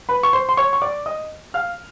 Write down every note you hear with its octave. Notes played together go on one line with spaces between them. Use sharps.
B4 B5
C#6
C5 C6
C6
C#5 C#6
C#6
D5 D6
D#5 D#6
F5 F6